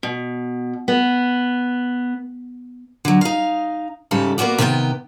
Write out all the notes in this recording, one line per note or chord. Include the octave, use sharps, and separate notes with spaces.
B2
B3
D3 F#3
D#4 F5
G#2 C#3 G3 A4 E5
A#3 B3 C#4 F#4 D5
C3 D#3 B3 B4 G5